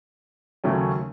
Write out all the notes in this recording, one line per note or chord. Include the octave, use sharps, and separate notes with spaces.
D#2 C#3 F#3 A3 C#4